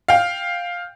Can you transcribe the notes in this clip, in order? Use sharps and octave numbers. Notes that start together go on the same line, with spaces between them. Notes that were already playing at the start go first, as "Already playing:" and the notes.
F5 G5